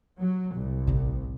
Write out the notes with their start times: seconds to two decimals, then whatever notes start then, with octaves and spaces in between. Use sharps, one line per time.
0.20 F#3
0.54 C2
0.87 A1 C3